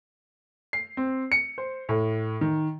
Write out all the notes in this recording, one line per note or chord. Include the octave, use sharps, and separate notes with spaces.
C7
C4
C#7
C5
A2
D#3